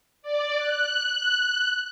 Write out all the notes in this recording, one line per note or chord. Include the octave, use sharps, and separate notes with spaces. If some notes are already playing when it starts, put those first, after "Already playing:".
D5
F#6